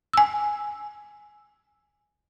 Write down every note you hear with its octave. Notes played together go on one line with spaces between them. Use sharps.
G#5 E6